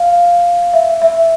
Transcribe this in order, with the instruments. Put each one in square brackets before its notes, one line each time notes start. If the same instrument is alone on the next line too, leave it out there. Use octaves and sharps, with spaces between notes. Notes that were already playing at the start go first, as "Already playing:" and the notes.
Already playing: [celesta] F5
E5
E5